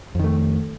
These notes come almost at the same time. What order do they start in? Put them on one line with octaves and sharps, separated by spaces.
F2 D#3 A3